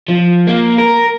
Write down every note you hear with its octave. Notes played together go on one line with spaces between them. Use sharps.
F3
A#3
A#4